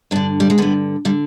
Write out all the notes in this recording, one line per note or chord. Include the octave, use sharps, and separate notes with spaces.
G2 D3 D4
G3
G#3
G2 D3 B3
D3 G3